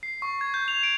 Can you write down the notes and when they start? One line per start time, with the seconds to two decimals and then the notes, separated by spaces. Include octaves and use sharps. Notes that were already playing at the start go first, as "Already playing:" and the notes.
0.03 C7
0.22 C#6
0.41 G#6
0.54 G6
0.68 F7
0.83 D7